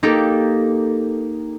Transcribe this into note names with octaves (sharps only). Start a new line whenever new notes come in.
A#3 D#4 G4 A4